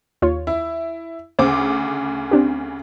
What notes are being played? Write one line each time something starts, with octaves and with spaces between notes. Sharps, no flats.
D#2 F4 C#5
E4
D2 C#3 C5 D6
C4 D4 G4